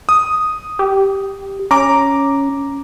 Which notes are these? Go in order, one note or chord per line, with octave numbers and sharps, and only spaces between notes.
D#6
G4
C#4 A#5 D6